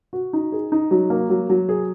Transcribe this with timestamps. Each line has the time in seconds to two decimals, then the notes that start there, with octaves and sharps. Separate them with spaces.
0.13 F#4
0.33 D#4
0.52 G#4
0.72 D#4
0.91 F#3
1.10 A#3
1.30 F#3
1.50 F#3
1.69 G#4